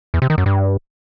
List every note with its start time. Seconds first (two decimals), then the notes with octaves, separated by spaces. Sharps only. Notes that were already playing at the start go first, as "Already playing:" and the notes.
0.14 E2
0.22 C3
0.30 D#3
0.38 F#2
0.46 G2